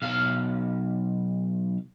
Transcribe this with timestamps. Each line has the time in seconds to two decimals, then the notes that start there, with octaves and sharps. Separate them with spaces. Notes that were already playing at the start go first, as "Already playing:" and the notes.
0.02 B1 F5